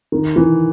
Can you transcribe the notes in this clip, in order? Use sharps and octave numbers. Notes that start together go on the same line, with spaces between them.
D#3
E3